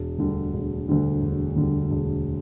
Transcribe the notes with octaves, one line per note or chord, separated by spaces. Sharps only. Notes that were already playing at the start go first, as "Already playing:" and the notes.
Already playing: E1
D2 D3 G3
E1
D2 D3 G3
E1
D2 D3 G3
E1